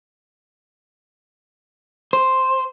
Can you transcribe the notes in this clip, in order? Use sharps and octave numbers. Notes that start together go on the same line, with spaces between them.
C5